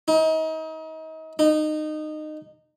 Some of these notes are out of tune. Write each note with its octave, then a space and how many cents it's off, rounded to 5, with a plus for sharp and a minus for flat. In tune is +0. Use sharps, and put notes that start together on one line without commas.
D#4 +35
D#4 -20